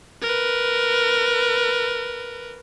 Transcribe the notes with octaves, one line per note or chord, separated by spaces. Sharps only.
A#4 B4